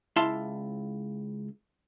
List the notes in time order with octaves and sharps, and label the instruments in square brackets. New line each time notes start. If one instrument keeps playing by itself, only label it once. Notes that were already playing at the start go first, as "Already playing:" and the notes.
[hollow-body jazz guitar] C#2 E4 F5 A5 C6